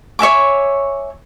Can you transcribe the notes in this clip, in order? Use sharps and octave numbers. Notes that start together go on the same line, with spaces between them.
C#5 E5 G#5 D6